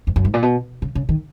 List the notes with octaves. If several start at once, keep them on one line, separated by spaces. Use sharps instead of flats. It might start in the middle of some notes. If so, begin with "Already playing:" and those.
F2
F#2
G#2
A#2
B2
C#3
C#3
D#3